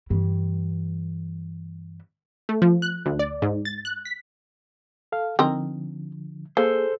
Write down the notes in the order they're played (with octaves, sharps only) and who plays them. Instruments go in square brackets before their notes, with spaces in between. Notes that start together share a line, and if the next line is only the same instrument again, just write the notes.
[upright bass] G2 E3
[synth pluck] A3
F3
F#6
D2
D5
G#2
A6
F#6
B6
[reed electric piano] A4 F5
[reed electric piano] D3 F3 [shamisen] C4 D#4 A#4
[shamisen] A#3 [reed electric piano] G#4 [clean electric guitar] A4 C5